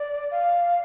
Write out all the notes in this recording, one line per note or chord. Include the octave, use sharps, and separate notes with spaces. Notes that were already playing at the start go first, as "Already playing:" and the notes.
Already playing: D5
F5